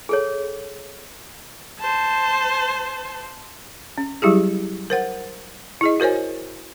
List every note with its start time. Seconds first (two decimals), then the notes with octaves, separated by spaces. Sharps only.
0.09 G#4 A4 C#5
1.79 C5 A5
3.98 C#4
4.22 F#3 G3 E4 G4 G#4
4.90 A#4 C5 F#5
5.81 E4 G#4 D#5
6.00 F#4 A#4 C5 C#5 G#5